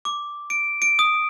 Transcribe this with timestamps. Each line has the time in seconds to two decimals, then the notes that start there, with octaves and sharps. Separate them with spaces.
0.05 D6
0.50 D7
0.82 D7
0.99 D#6